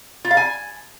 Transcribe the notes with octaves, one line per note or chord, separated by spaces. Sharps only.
F4
F5
G#5